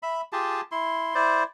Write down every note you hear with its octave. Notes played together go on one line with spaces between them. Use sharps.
E5 B5
F4 G4 G#4 A5
E4 C6
E4 C5 D5